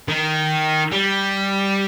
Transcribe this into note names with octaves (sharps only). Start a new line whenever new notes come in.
D#3
G3